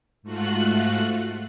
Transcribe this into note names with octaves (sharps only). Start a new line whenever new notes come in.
G#2 A3 F4 F#4 F#6